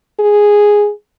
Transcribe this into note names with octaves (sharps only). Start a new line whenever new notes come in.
G#4